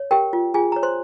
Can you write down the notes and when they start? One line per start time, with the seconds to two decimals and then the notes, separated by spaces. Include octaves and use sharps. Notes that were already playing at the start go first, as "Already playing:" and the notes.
Already playing: C#5
0.11 G4 A#4 G5
0.33 F4
0.54 F4 G#4 G#5
0.72 C#5 A#5
0.83 C5 C6